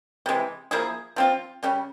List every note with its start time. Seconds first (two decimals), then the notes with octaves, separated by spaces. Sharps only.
0.26 C3 E3 G#3
0.71 F3 A#3 E4 G#4
1.16 F3 C4 F4
1.63 C#3 G3 C#4